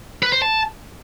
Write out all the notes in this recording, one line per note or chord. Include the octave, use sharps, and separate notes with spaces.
B4
C5
A5